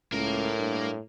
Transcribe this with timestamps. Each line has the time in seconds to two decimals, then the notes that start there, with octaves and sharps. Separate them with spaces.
0.12 C#2 A2 A#3 A#4
0.59 G2